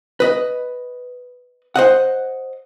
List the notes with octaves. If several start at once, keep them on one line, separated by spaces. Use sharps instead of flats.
B4 D#5
C5 D#5 F#5